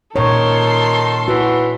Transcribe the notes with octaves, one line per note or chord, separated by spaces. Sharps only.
A#2 D#3 A4 C#5 C6
E3 F#4